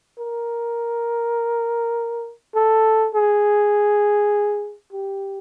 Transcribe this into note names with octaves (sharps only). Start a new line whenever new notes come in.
A#4
A4
G#4
G4